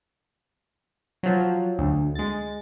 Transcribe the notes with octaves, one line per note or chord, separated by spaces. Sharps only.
F3 F#3
D2
G#3 A6